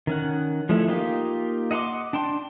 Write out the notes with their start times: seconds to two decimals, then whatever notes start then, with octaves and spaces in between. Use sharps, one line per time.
0.07 D#3 C#4 F#5
0.69 F3 G#3 A3 E4
0.88 A#3 D#4 F4 G4
1.71 D#5 F#5 A5 C6 D6
2.13 D4 G5 A5 C6